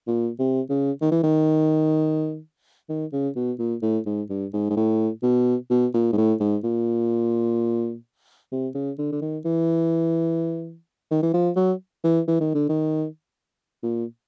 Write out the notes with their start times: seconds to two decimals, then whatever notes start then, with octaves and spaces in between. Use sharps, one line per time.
0.07 A#2
0.39 C3
0.69 C#3
1.01 D#3
1.11 E3
1.23 D#3
2.89 D#3
3.12 C#3
3.36 B2
3.58 A#2
3.82 A2
4.06 G#2
4.29 G2
4.53 G#2
4.70 G#2
4.76 A2
5.22 B2
5.70 B2
5.94 A#2
6.12 G#2
6.17 A2
6.40 G#2
6.64 A#2
8.52 C3
8.74 C#3
8.98 D3
9.12 D3
9.21 D#3
9.45 E3
11.11 D#3
11.22 E3
11.34 F3
11.56 F#3
12.04 E3
12.27 E3
12.40 D#3
12.54 D3
12.69 D#3
13.83 A#2